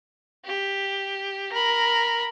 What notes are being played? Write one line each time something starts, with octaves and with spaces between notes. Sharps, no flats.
G4
A#4 B5